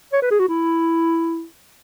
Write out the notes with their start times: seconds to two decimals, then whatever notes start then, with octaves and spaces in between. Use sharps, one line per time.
0.13 C#5
0.22 B4
0.31 G#4
0.39 F#4
0.48 E4